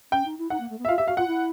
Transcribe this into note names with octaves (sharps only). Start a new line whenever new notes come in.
C#4 G5
D#4
E4
D#4 F#5
A#3
A3
B3
E5
F4 F5
G4 E5
F#4 F5
F4 F#5
E4